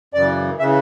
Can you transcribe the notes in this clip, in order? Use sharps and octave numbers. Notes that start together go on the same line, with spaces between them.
F#2 C#3 E3 D5
C#3 E3 E5